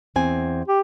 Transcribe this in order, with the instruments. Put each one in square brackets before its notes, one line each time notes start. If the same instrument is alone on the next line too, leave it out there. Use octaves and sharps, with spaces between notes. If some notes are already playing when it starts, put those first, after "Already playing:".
[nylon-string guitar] E2 C4 G#5
[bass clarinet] G4